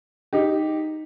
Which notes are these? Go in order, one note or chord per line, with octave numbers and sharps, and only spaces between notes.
D#4 G4